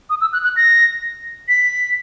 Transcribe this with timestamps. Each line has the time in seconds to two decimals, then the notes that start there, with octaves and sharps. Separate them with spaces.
0.10 D#6
0.21 E6
0.33 F#6
0.44 F#6
0.56 A#6
1.48 B6